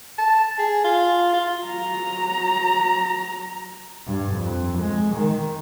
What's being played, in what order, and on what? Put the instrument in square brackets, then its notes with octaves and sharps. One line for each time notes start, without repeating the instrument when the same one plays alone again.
[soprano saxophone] A5
G#4
F4
F4
[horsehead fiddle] F#3 A#5
[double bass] G2
F2
G#3
D#3